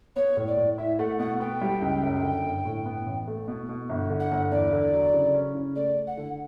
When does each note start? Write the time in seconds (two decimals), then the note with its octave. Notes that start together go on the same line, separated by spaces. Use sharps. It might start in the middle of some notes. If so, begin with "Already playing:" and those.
0.16 B3 C#5
0.37 A2
0.48 D5
0.57 A2
0.78 E4 E5
0.99 A3 F#5
1.19 B2 F#5
1.40 B3 G5
1.61 G3
1.82 C#2
2.02 F#2
2.23 D3
2.44 G1
2.65 A2
2.85 B3
3.06 A1
3.28 A3
3.48 B2
3.69 B2
3.89 G1
4.10 D3
4.20 F#5
4.31 G1
4.51 E2 D5
4.72 D3
4.93 F#3
5.14 C#3
5.34 C#4
5.55 C#3
5.75 A3 D5
5.97 A3
6.07 F#5
6.17 D3